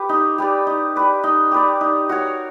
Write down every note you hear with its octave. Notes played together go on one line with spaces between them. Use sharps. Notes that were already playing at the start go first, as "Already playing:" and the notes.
Already playing: G4 B4
D#4
G4 B4 D5
D#4
G4 B4 D5
D#4
G4 B4 D5
D#4
F#4 A#4 C#5